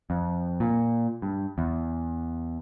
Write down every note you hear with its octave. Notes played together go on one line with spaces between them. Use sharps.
F2
A#2
G2
E2